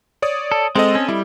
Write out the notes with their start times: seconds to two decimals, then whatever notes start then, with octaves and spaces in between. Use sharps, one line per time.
0.22 C#5 D5 D#6
0.52 A4
0.75 G#3 C4 A4 D#5
0.95 C#4
1.09 G3 E4